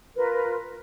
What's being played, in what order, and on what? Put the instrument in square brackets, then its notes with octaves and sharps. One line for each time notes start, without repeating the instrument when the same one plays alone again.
[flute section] F4 A#4 B4